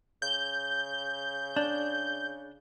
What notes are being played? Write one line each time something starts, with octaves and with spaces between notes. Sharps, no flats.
C#3 G6
D4